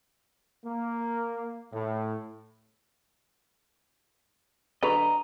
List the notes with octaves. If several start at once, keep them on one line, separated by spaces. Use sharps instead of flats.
A#3
A2
D3 F#3 B4 D#5 A#5